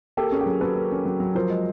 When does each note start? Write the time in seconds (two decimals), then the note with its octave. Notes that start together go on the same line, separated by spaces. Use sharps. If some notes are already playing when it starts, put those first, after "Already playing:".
0.17 A#3 G4 A4
0.32 C#4 G#4
0.41 G4
0.46 F#3 G#4
0.61 F#3 A4 B4
0.76 A#3
0.92 C#4
1.05 F#3
1.20 F#3
1.35 F3 A#4 C5
1.50 G#3